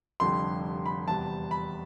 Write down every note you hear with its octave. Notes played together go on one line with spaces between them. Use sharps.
F1 F2 D3 G3 C6
B5
E2 C3 G3 A5
B5